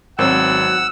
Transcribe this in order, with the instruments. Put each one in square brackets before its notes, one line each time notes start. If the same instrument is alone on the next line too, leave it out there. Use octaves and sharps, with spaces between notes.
[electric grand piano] G#1 [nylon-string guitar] F#3 B3 C4 [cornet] F#5 [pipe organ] E6